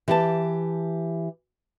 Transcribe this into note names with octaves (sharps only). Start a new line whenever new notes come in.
E3 G4 A5